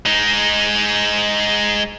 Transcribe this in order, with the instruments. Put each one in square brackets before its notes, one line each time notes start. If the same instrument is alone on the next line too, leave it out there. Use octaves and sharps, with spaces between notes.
[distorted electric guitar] G#3 D#4